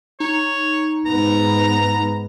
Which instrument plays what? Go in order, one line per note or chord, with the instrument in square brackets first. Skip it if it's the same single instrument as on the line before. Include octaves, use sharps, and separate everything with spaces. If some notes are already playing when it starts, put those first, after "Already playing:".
[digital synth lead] D#4 [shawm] C#5
[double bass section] G#2 B3 [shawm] A#5